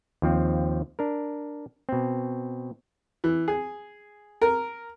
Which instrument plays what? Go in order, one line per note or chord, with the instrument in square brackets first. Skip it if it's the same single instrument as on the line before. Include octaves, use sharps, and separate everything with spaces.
[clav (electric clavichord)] D#2 F3 C4
D4 A#4
B2 C4
[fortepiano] E3
G#4
A#4